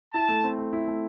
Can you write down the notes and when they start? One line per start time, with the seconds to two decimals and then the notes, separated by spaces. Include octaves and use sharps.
0.14 E4 A5
0.29 A3
0.44 C4
0.59 A3
0.73 E4
0.88 A3